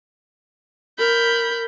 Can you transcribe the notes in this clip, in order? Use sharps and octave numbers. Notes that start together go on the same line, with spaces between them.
A#4 B5 G6